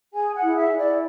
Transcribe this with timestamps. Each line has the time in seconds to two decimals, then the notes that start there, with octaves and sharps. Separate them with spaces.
0.14 G#4 G#5
0.34 F#5
0.42 E4
0.56 E5
0.70 E4
0.77 D5